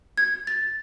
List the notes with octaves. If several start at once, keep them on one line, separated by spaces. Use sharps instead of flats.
G#6
A6